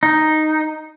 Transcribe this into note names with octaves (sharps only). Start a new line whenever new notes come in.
D#4